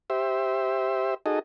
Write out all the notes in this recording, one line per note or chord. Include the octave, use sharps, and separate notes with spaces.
G4 C5 E5
D#4 F#4 G#4 A4 D#5